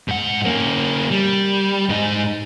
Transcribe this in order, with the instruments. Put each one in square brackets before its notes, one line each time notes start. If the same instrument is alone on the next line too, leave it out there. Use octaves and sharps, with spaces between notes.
[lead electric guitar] G#2 F#5
A#3 C#4
G3
G#2 D#4